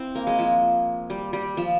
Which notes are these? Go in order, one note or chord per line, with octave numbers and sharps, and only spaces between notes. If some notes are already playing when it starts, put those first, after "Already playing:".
Already playing: C4 E4
A#3
G#3
F3
G3
G3
F3